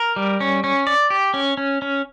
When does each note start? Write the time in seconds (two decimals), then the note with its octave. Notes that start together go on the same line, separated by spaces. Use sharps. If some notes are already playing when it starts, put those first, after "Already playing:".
Already playing: A#4
0.16 G3
0.40 C#4
0.64 C#4
0.87 D5
1.10 G4
1.34 C#4
1.57 C#4
1.82 C#4